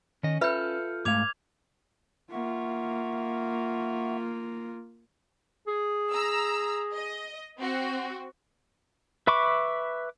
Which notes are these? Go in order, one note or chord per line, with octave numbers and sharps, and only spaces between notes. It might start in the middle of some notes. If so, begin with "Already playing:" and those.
D#3 C#4 D#5
F4 A4 B4 E5 B5 F6 G6
G#2 A3 F5 D6 G#6 F7
A#3 F4 E5 F#5 C#6
G#4
A#5 E6
D#5
C4 F#4
B4 E5 B5 C#6 D6